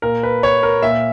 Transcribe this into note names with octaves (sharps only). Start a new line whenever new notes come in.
A#2 A#4
B4
C#5
A#4
A#2 E5